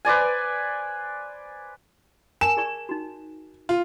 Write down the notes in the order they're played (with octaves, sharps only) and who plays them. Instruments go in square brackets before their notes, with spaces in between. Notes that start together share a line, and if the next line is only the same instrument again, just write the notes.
[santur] B4 C5 D5 G#5
[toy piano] A#4 G#5 A5 [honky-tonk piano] E7
[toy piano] G#4 D5 C#6
D#4 F#4
[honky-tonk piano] F4